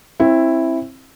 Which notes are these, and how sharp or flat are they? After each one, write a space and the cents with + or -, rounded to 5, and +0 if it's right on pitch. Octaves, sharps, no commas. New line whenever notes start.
C4 +30 E4 +0